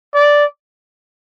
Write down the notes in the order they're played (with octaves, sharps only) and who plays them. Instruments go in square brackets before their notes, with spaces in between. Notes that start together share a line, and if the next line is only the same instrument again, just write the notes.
[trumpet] D5